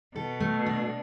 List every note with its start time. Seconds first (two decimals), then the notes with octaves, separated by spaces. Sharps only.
0.16 B2 A4
0.40 A3
0.66 D4